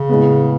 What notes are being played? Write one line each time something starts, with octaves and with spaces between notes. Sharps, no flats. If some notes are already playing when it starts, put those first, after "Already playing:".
Already playing: C#3
A2 G#3 B3